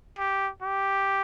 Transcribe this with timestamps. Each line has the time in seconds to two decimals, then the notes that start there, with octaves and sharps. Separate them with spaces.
0.18 G4
0.62 G4